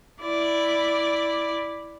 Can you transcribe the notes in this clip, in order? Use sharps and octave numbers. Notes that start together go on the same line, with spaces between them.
E4 D5